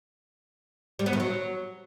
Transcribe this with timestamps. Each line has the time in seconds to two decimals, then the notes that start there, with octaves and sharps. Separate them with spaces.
0.99 G3
1.06 B3
1.13 D#3
1.20 F#3